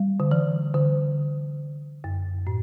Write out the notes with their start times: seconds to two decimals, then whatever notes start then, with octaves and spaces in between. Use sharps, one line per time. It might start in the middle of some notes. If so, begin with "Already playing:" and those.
Already playing: G3
0.20 D3
0.31 E3
0.74 D3
2.04 F#2
2.47 A2